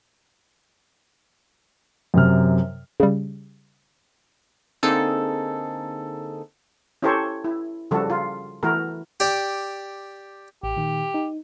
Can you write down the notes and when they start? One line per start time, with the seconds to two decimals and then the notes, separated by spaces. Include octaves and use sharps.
2.14 F#2 C3 F6
3.00 C#3 G3
4.83 D3 A#3 C4 D#4 G#4 A4
7.02 C#4 E4 G4 A4 C5 C#5
7.44 E4
7.91 C#3 F3 G3 F#4 A4
8.10 F4
8.63 E3 A3 E4 F#4 A#4
9.20 G4 D5
10.63 A1 G4
10.76 A#2 D#3
11.14 D#4